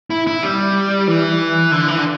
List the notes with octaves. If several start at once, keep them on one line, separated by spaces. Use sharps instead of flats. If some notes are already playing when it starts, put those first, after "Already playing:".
E4
E4
G3
E3
D3
E3
D3